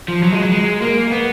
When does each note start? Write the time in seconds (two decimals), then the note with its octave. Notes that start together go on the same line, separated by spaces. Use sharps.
0.08 F3
0.23 F#3
0.33 G#3
0.42 F#3
0.52 G#3
0.82 A#3
1.12 B3